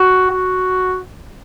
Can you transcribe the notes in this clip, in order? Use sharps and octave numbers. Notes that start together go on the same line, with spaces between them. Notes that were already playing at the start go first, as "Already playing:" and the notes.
Already playing: F#4
F#4